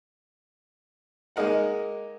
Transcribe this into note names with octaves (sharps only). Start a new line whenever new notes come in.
G#3 A#3 D#4 A#4 F#5